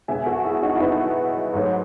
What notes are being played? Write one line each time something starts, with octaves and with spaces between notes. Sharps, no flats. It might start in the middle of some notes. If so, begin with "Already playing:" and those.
B2 G#3 E5 G#5
F#4 A4
E4 G#4
D#4 F#4
E4
B3 D#4
G#2 F#3 A3